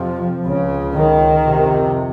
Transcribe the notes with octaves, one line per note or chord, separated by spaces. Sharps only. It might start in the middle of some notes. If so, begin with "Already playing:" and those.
Already playing: F2 C3 F3
C#2 C#3
D#3
F2 C3